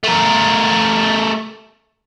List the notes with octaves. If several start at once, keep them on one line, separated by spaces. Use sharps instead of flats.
A3 A#4